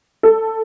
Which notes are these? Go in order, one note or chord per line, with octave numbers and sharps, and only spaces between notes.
A4